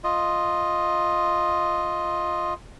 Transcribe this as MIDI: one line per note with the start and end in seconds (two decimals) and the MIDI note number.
0.04 2.54 65
0.04 2.54 75